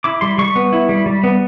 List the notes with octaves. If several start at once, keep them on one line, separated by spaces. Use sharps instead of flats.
E4 D6
G3 C6
G3 C#6
B3
E4
G3
G3
B3